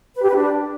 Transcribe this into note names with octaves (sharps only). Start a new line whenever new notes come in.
B4
G4
B4
D4